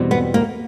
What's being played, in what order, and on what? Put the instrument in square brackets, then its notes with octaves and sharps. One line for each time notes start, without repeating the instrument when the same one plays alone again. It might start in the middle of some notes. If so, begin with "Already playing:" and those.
Already playing: [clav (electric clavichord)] E2 B2 G3 C4
[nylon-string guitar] B3
A#3